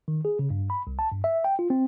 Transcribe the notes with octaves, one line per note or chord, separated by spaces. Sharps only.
D#3
G#4
C#3
G2
B5
C2
A5
G2
E5
G5
F4
C4